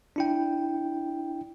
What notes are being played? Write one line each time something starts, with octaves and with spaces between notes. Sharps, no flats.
D4 E4 G5